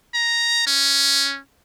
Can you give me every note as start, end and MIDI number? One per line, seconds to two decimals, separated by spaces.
0.14 0.62 82
0.67 1.40 61